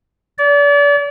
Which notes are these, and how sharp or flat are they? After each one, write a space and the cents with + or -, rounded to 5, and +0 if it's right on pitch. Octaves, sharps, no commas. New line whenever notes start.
D5 -35